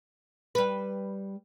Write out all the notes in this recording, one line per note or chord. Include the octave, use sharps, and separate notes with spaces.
G3 B4